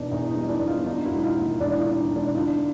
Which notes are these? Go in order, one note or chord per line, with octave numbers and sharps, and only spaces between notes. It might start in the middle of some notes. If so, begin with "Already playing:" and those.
Already playing: E2 B2 D4 D#4
E2 D#4
D#4
G3
D4 E4
E2
D#4 F4
D3 D#4 F4
E4 F#4
E1
D#4 F4
D#2
E1 D4 E4
D#4 F4
D3
D#4
E1
D4 E4
D3 D#4 F4